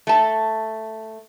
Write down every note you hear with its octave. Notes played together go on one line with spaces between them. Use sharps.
A3 A5